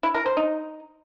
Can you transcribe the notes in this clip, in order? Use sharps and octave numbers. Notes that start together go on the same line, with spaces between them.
E4
A#4
C5
D#4